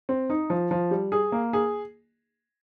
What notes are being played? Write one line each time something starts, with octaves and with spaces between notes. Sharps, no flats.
C4
D#4
F3
F3
G3
G#4
A#3
G#4